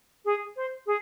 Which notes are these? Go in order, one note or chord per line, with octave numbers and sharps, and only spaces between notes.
G#4
C5
G#4